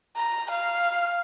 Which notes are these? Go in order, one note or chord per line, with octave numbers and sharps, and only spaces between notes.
A#5
F5